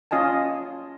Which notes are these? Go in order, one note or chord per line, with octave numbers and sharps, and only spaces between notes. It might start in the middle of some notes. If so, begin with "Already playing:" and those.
C#4 F4 D#5 G#5 A5